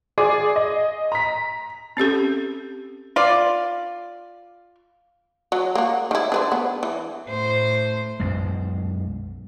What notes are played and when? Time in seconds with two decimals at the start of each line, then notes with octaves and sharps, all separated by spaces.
0.18 G#4 D5 G#5 D6
0.56 D#5
1.12 A#5 B6
1.97 C4 C#4 G4 A4
3.16 F4 D5
5.52 F#3
5.75 A#3 F#4
6.11 D#3 E4
6.32 D4 B4 C5
6.52 B3
6.83 E3
7.28 A2 C5
8.20 B1 F#2 G#3